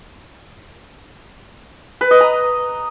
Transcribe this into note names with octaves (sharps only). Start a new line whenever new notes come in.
B4
D#5
A#5